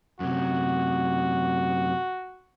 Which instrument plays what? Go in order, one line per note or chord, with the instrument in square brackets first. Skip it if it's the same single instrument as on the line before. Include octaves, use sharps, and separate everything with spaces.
[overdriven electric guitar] F#2 C3 [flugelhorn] F#4